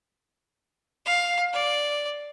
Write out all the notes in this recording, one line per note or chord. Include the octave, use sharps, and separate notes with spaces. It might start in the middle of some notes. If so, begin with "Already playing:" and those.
F5
D5